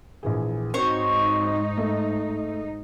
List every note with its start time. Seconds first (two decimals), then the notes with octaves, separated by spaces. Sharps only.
0.23 A#1 E3 G#4
0.74 G#2 C4 D#4 F#4 C5 C#5 C#6
1.78 A3